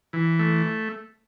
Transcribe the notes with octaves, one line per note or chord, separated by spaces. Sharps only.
E3
A3